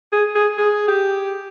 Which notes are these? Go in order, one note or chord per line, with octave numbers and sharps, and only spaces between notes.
G#4
G#4
G#4
G4